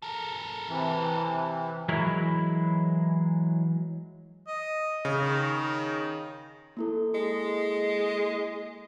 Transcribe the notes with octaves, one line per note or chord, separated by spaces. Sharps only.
A4 A#4
C3 E3
E3 F#3 G#3 E4 A#4
D#5
C#3
D#3
A#3 E4 A4
G#3